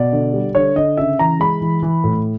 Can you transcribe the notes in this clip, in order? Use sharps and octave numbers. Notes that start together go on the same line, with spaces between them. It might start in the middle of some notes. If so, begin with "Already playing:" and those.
Already playing: B2 D5
D3
G3
D3 C#5
D3 D#5
C#3 E5
E3 A#5
G#3 B5
E3
E3
A2